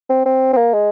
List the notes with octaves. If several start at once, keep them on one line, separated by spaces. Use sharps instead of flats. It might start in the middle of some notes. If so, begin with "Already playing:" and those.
C4
C4
C4
A#3
G#3